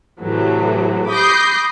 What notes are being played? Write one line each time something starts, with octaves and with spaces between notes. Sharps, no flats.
A2 C3 E3 F#3 A3
B5 D6 D#6 G6 A#6 C7